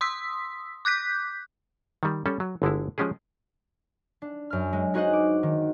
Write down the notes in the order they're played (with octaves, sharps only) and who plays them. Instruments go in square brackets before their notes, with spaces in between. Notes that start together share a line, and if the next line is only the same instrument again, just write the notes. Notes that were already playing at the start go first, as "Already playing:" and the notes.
[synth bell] C6 D#6 E6 B6
D6 F#6 G6 B6
[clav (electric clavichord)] D#3 G3
G3 C#4 A4
F#3
G1 D3 G#3 E4
F3 G#3 C#4 G4 G#4
[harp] D4
F#2 F6
G#3
D#4 F#4 G#4 C5 D#5 F#5
D6
D#3